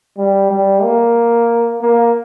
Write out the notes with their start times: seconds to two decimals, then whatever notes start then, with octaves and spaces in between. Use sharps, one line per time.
0.18 G3
0.51 G3
0.82 A#3
1.81 A#3